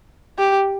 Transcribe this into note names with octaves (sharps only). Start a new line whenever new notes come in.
G4